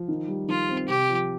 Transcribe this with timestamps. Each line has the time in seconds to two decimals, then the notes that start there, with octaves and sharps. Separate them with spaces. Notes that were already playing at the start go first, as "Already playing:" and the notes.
Already playing: F3
0.08 D#3
0.28 G3
0.48 D#3 F4
0.69 C4
0.88 C3 G4
1.09 F3